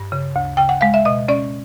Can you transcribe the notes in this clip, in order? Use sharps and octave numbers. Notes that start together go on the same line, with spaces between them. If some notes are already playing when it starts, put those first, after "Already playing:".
Already playing: G2
C#3
D2
C#3 G5
F#5
G#3 F5
E5
B2 D#5
C#4 D5